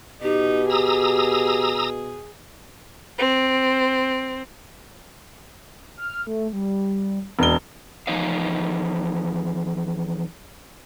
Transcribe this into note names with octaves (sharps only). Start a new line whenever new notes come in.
B2 D#4 G4
G#4 A#5 D#6 E6
C4
F6
A3
G3
E1 D4 G7
E2 F3 D#4 D#5 F5